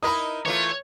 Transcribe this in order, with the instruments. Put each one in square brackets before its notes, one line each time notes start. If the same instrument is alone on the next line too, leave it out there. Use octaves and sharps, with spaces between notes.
[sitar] D#4 E4 A#4 [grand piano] B5 D#6
[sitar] E3 A3 F4 [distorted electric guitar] C#5